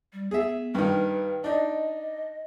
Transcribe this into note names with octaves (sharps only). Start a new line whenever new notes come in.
G3
B3 G#4 E5
G2 D#3 B4
D4 D#4 D#5